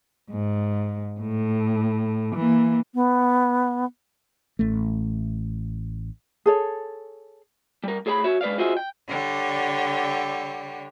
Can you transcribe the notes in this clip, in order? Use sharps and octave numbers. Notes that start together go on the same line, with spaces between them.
G#2
A2
E3 A#3
B3
A1 A3
G#4 A4 C#5
G3 A#4
A2 G#4 C#5 A5 B5
F#4 C#5 E5
G#3 B4 D5 F5
F4 F#4 G#4 C5 D#5 E5
G5
D3 G3 C#5